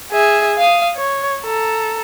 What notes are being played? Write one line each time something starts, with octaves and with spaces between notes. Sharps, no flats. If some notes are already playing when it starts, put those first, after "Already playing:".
G#4 E5
F5 D#6
C#5
A4 A#5